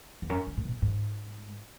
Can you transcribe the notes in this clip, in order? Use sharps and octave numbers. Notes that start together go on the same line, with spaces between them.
E2
F#2
D#3
A2
B2
G#2